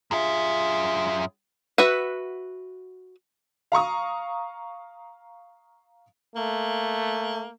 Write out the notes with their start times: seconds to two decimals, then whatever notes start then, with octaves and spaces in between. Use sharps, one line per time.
0.11 F#2 F4 G#4 E5
1.78 F#4 B4 E5 F#5
3.72 F5 A#5 C#6 D#6
6.36 A3 A#3